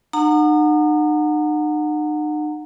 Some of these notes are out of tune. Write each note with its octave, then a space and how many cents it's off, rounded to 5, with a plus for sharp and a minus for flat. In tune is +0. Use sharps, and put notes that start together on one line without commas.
D#4 -45 F#5 -20 A#5 -25